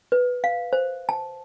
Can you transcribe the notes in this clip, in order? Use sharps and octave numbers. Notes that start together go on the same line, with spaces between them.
B4
F5
C5
A5